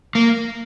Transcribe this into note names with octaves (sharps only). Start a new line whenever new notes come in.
A#3